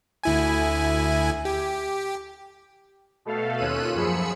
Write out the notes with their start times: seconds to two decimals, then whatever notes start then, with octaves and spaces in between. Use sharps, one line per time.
0.23 D2 E4 G#5
1.45 G4
3.25 B2 A3 A4 F5
3.58 D#2 C#4 F4 E6 F#6 D#7
3.95 F#2 F3 G#4 B5 E6 C#7